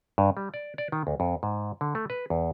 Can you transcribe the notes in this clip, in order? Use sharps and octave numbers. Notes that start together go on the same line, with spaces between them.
G2
G3
D5
D5
D#3
D2
F2
G#2
D3
A3
B4
E2